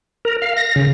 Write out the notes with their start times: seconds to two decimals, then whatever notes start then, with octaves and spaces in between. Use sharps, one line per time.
0.25 A#4
0.42 F5
0.57 A#6
0.76 C#3